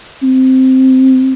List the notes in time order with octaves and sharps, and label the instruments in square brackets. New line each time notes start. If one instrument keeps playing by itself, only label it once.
[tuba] C4